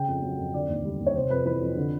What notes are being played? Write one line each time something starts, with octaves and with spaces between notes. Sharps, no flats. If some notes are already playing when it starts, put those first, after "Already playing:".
Already playing: C#3 G5
F2
F#3
F2
D3 D5
D#2
G3
D#2
C#5
C3 C5
F2 B4
E3 B4
F2
D3